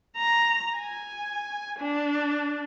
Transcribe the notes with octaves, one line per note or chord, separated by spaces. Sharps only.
A#5
G#5
D4